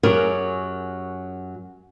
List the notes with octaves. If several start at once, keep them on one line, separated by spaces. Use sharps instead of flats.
F#2 F#3 G4 G#4 A#4